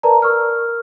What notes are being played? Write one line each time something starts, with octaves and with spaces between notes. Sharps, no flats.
A#4 B4 D5 A5 A#5
A#4 C#6 E6 F6